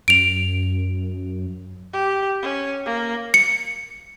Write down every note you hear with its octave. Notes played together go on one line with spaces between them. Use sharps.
F#2 D7 F7
G4
C#4
A#3
C#7